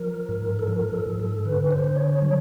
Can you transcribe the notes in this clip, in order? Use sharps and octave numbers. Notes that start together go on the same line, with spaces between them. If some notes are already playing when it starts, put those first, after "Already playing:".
Already playing: F3 A#4
G#2
A4
F3 A#4
A4
G#2
A4
D3 B4
C5
D3
C#5
F#3